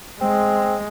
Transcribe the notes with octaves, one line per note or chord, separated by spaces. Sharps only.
G#3 C4